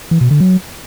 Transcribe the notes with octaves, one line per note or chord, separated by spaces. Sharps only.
E3
B2
D3
F#3